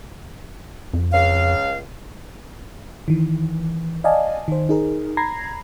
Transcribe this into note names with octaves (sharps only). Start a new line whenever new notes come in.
F2
C#2 F5
D#3 E3
D5 D#5 F5 G#5 A5
D#3 C5
D#4 G#4 A#4
A#5 B5 G#6 A#6 C7